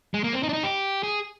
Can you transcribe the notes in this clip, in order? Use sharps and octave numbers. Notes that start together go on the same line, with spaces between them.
G#3
A#3
C4
D#4
D4
D#4
G4
G#4